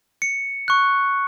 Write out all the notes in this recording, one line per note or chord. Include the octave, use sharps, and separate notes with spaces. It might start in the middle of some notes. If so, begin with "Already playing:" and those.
C#7
C#6 F#6